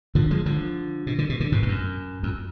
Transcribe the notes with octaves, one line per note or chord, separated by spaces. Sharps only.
D3 F3
F3 G#3
D3 F3
B2
D3
B2
D3
G#2 B2
G#2
F#2
F2